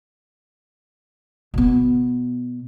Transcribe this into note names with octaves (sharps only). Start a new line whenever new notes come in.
B2 B3